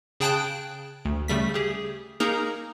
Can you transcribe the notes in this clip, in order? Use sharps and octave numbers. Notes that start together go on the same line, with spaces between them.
C#3 G#4 G5 A5 F#6 D7
D2
C#3 G3 A3 B6
G4 G#4
A#3 D#4 G#4 A#4 A#5